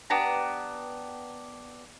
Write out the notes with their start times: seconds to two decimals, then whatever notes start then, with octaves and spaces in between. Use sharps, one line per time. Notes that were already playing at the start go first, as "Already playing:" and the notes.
0.10 B3 D4 G4 A#5